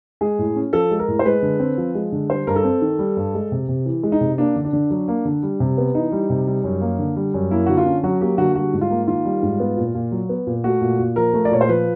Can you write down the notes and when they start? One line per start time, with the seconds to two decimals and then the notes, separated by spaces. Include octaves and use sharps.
0.21 G#3 G#4
0.39 A2
0.56 C#4
0.73 F3 A4
0.91 G#3
0.99 A#4
1.08 A2
1.19 C5
1.25 G#3 B4
1.43 D3
1.60 C4
1.78 F3
1.95 G#3
2.12 D3
2.30 G3 C5
2.47 G2 A#4
2.56 A4
2.64 C4
2.82 D#3
2.99 G3
3.17 G2
3.34 G#3
3.52 C3
3.69 C3
3.86 E3
4.03 G#3
4.12 D#4
4.21 C3
4.38 A#3 D4
4.56 D3
4.65 D4
4.73 D3
4.90 F#3
5.08 A#3
5.25 D3
5.43 G3
5.60 C3
5.78 B3
5.95 E3 D#4
6.12 G3
6.30 C3
6.47 G3
6.64 F#2
6.81 A#3
6.99 D3
7.16 G3
7.34 F#2
7.51 A#3 E4
7.66 D3 F#4
7.77 F4
7.86 C#4
8.03 F#3 F#4
8.21 A#3 G4
8.38 D3 F#4
8.56 G3 F#4
8.73 G#2
8.81 F4
8.90 A#3
9.08 D#3 F4
9.25 G3
9.43 G#2
9.60 B3
9.77 A#2
9.95 A#2
10.12 F#3
10.29 B3
10.47 A#2
10.64 A3 F#4
10.81 A#2
10.99 A#2
11.16 F3 A#4
11.34 A3
11.45 D5
11.51 A#2 C#5
11.61 C5
11.69 F3 B4